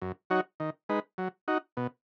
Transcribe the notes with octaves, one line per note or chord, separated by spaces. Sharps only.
F#2
F#3 D#4 F#4 C#5
D#3
G#3 D#4 B4
F#3
D#4 F#4
B2